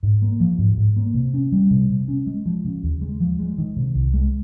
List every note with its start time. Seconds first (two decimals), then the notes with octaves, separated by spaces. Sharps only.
0.03 G#2
0.22 A#3
0.40 F3
0.58 G#2
0.77 G#2
0.96 A#3
1.14 C3
1.34 C#4
1.52 G3
1.71 C3
1.90 C3
2.08 C#4
2.26 G#3
2.46 F3
2.65 C#3
2.83 D#2
3.01 G#3
3.20 F3
3.39 G#3
3.58 D#3
3.77 C3
3.95 C2
4.14 G#3